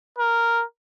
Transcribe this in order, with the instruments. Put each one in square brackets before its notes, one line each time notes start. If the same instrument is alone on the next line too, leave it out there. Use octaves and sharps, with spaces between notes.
[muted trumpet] A#4